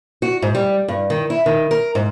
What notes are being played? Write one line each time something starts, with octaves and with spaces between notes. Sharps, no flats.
F#4
G#2
G3
G2
D#3
E4
D#3
A#4
G#2